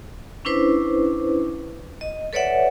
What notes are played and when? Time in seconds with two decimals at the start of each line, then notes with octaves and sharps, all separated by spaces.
0.45 C#4 D4 E4 B4 C5
2.01 D#5
2.33 A4 B4 C#5 D5 E5 F#5